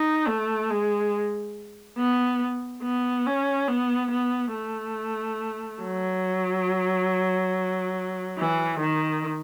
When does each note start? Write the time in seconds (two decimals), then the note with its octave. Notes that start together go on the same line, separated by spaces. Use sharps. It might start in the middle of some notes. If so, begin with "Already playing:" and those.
Already playing: D#4
0.27 A3
0.70 G#3
1.98 B3
2.83 B3
3.26 C#4
3.68 B3
4.11 B3
4.54 A3
5.82 F#3
8.38 E3
8.80 D#3